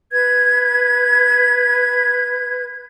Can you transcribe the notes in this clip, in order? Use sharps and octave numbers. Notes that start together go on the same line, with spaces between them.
B4 G#6